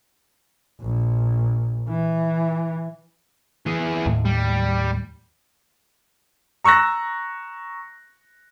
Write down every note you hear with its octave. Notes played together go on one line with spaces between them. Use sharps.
A#1
E3
E3 G#4
D#2 A2
G3
A#5 C#6 E6 F#6 A#6